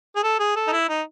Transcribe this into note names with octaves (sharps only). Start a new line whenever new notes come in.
G#4
A4
G#4
A4
D#4
E4
D#4